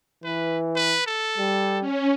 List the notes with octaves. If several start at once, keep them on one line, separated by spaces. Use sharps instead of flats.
E3 B4
B4
A4
G3
C#4